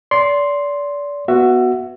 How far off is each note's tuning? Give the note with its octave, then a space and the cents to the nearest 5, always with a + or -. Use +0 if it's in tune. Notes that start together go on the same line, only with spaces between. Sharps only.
D5 -30 C6 +0
B3 +0 F#4 +0 E5 +20